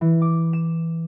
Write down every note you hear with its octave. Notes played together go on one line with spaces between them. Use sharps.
E3
D6
E7